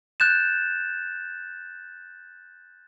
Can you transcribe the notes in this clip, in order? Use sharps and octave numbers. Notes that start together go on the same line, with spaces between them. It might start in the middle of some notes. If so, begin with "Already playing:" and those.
F#6 G6 A6 E7